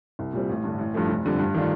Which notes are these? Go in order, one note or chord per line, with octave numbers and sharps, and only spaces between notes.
C2
A#2 G3 C4
A1
G2 D3
A1
G2 F3 A3
F1
F2 D3 G3
G2
D#3 A3 D4 F4